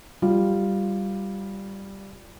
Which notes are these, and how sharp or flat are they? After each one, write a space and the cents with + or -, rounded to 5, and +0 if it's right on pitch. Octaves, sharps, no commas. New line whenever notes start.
G3 +0 F4 -5